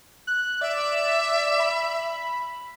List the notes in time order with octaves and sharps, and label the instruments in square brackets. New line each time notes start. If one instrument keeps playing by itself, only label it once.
[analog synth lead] F#6
[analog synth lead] D5 [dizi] E5
[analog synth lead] B5